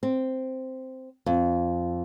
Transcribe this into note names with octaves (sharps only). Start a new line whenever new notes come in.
C4
F2